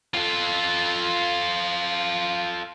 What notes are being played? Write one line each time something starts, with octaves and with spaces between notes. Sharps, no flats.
F4 A4